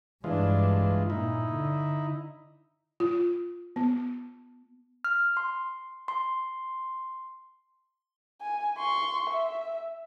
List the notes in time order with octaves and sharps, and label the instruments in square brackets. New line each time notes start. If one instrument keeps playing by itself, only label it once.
[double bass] G2 D4 [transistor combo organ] E3 G#3 F4
[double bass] A#2 [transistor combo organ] D#4 E4
[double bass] D3
[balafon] F4
B3
[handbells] F6
C6
C6
[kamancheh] G#5
C6 C#6
E5